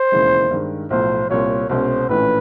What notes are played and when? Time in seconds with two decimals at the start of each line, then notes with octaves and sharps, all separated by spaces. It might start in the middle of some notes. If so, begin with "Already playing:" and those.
Already playing: C5
0.12 E1 D#2 C#3 E3 G#3
0.51 G2 D#3 G#3
0.90 B1 A2 F3 C5
1.30 C2 A#2 G3 C4 C#5
1.69 C2 B2 G#3 C#4 C5
2.09 A#1 A2 E3 A3 C#4 B4